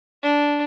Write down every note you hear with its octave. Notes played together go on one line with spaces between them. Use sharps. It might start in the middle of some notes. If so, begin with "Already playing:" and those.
D4